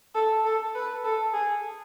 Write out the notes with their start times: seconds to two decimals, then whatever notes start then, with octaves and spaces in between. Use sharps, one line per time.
0.15 A4
0.45 A4
0.75 B4
1.04 A4
1.33 G#4